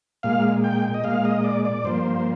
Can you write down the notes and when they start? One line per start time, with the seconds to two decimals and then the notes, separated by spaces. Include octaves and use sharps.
0.23 A#2 G#3 F5
0.64 G5
0.94 D#5
1.04 A#2 G#3 F5
1.25 D#5
1.44 D5
1.65 D5
1.84 G2 F3 A#3 C5